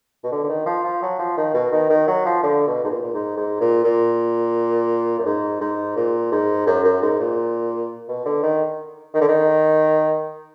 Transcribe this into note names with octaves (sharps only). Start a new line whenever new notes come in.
B2
D3
D3
D#3
F3
F3
F#3
F3
D#3
B2
D#3
D#3
F#3
F3
D3
B2
G#2
A#2
A#2
G#2
G#2
A#2
A#2
F#2
G#2
G#2
A#2
G#2
F#2
F#2
G#2
A#2
B2
D3
D#3
D#3
D3
D#3